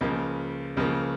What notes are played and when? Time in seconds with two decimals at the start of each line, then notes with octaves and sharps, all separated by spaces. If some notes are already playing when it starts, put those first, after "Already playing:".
0.01 C#2 C#3 F3 A#3
0.77 C#2 C#3 F3 A#3